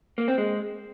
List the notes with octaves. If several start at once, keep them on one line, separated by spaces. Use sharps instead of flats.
A#3
C4
G#3